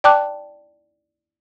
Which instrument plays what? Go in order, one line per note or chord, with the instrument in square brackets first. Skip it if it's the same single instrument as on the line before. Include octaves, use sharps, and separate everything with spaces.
[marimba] D5 G5 A5 D6 F#6